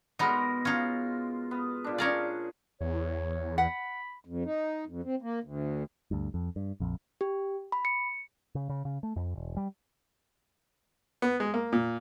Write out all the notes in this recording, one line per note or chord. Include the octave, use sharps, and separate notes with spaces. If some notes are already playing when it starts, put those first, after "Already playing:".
B2 G#3 B3 D#4 A#4
C#4 D#4 F4
B3
A#2 D4
C#4 D4 G#4 A#4 D5
E2 C#5
F#5 B5
F2
D#4
F2
C4
A#3
D2
D2 G2
F2
G2
A#1 F2
G4
B5
C#7
C#3
C#3
C#3
A3
F2
E1
G3
B3
G#3
A#3
A#2